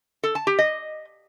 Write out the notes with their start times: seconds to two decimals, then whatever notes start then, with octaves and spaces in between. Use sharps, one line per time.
0.23 A4
0.35 A5
0.47 G4
0.59 D#5